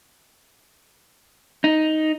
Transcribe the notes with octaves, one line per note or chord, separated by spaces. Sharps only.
D#4